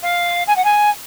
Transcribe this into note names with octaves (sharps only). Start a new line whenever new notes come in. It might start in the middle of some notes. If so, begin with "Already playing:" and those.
F5
G#5
F#5
G#5